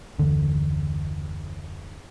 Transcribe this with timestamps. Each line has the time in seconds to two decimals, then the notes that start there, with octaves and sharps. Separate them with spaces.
0.19 F#1 D#2 D3 E3